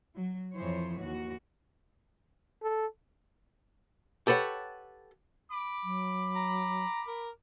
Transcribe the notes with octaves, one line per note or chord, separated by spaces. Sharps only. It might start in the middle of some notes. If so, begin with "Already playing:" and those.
F#3
F2 E3 F3 C5 C#5
D#2 F#4
A4
G4 A4 B4 C#5 F#5
B5 D6
F#3
A#5
A#4